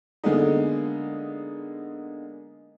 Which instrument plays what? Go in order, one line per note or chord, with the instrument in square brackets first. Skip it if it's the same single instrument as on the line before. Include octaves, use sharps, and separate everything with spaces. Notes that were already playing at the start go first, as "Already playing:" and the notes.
[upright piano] D3 G#3 A#3 B3 D#4